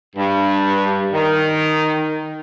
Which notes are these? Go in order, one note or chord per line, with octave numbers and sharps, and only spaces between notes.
G2
D#3